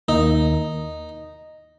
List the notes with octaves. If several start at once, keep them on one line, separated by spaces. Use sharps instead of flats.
D#2 D#3 A#3 D#4